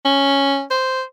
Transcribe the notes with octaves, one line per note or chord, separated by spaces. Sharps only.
C#4
C5